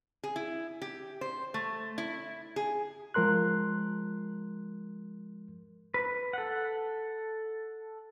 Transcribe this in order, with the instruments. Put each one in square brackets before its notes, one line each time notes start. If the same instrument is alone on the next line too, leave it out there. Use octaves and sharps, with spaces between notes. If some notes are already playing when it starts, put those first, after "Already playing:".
[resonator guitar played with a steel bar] G#4
E4
G4
C5
A3
E4
G#4
[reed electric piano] F3 G#3 A#4 C6 F#6
[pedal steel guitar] B4
A4 F#5